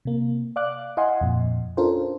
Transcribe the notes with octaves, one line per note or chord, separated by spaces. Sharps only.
C3 A#3
D5 F5 D6 F#6
E4 D#5 F5 F#5 G#5 C6
F2 A#2
C#4 D4 F4 A4 A#4 C5